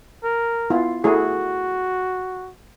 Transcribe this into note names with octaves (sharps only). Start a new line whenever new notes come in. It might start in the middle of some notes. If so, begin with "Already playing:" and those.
A#4
B3 E4 F4
A3 E4 F#4 G#4